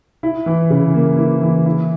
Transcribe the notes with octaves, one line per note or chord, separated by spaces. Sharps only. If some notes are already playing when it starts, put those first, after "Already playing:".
E4
E3
C#3
A#3
E4
E3
E4